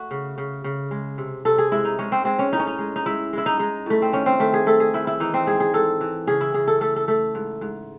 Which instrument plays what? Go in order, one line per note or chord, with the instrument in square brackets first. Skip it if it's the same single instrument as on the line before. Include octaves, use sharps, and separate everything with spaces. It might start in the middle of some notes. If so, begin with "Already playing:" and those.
Already playing: [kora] A3 F#4
C#3
C#3
C#3
G#3
C3
C3 A4
G#4
G#3 E4
D#4
G#3 C#4
C4
G#3 C4
C#4
A2 D#4
C#4
D#4
G#3
D#4
G#3 E4
G#3 E4
D#4
G#3 D#4
A2 A3
C4
D#3 C#4
C4
D#3 A3
G#4
A3 A4
G#4
D#3 E4
E4
E3 D#4
C4
G#2 G#4
G#4
G#2 A4
E3
C#3 G#4
E4
C#3 G#4
A4
A3 A4
A4
A3 A4
G#2
G#2